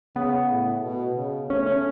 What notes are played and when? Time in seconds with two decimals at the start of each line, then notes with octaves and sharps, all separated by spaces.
0.16 C#3 B3
0.49 A2
0.83 B2
1.16 C#3
1.50 A3 C#4
1.66 C#4